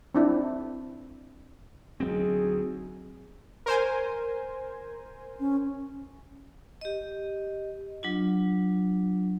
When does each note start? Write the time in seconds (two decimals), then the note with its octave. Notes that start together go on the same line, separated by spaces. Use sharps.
0.15 C4 D4 E4
2.00 D2 F#3 B3 C4 D#4 G#4
3.66 A#4 C5 G#5
5.40 C#4
6.81 G4 D#5
8.03 F#3 D4 F4